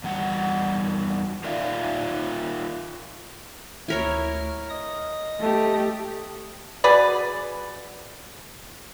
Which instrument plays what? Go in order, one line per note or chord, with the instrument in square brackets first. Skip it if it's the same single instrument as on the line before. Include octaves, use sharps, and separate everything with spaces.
[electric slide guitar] E2 G3 F#5
D#4 F4 A#4 D5 E5 F5
[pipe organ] D2 F6 [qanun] E4 A#4 C#5
[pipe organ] D#5 D#6
[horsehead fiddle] A3 G4
[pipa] F#4 G#4 B4 D5